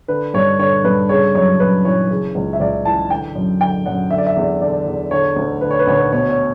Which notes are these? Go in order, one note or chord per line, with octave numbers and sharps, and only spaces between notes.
D3 B4
G2 C#5
D3 C#5
G2 B4
C#3 C#5
F#2 C#5
F#2 B4
E3 C#5
C#3
C#2
E5
C#2 D5
E3 A5
D3 G5
F#2
D3 G5
F#2 F#5
D3 E5
D5
E5
E2
D3 D5
E2
D3 C#5
D2
D3 B4
C#5
B4
D2 C#5
B4
B2 C#5
C#5